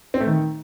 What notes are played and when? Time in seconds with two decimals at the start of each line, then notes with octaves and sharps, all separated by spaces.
0.14 C4
0.20 A3
0.27 D#3